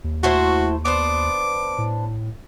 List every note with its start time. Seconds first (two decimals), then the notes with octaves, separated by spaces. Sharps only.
0.04 D#2
0.23 A3 E4 F#4 C5
0.85 B3 D4 C5 D6
1.78 A2